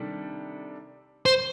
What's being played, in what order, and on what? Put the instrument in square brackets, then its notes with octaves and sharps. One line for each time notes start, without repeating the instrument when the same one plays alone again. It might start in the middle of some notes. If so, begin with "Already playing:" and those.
Already playing: [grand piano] C3 D#3 G3 D4 A4
[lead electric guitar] C5